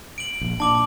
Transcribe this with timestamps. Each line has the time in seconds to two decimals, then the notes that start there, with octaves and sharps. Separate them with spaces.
0.18 D7 F#7
0.41 A#1
0.60 A#2 D4 A5 D6 F#7